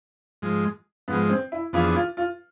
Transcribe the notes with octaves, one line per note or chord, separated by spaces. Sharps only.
G#2 F3 G#3
G#2 F3 G#3 B3
C4
E4
F2 E3 B3 D4 F4 G#4
F4
F4